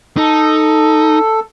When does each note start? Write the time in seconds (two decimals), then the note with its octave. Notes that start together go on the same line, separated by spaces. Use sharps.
0.17 D#4 A4